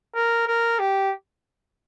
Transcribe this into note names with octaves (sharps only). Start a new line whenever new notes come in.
A#4
A#4
G4